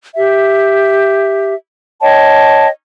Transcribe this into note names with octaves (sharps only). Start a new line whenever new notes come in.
G4 E5
C#5 D#5 G5 A5